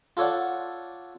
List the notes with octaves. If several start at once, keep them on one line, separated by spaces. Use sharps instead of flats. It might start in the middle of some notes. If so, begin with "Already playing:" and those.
F4 A4 C#5 D5 F#5